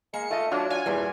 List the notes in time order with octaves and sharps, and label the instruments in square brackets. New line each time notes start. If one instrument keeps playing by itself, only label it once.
[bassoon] G#3 [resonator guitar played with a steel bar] A#3 [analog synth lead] C#7
[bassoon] A3 [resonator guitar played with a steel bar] F4 D#5
[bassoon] F#3 [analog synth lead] D4 [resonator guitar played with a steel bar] F4
[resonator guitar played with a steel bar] F4 [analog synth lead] G#5
[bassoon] E2 [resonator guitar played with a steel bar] G2 A#2 G3